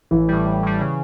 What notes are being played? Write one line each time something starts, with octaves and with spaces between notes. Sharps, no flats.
A1 E3
A2 G3
A1
A2 G3
C#3